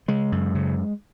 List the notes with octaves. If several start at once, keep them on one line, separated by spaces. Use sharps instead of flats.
C#3 G#3
F#2
C#3